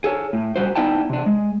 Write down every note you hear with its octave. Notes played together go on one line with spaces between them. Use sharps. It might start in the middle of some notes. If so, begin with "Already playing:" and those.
G#4 A4 C#5
A2
A#2 G3 F#4 C5
B3 D#4 E4 D5 G5 A5
C3 D4
G#3